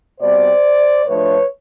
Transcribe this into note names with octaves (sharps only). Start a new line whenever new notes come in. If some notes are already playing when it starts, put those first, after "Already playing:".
B2 G3 C4 C5 D5
A2 F3 A3 D4 B4 C#5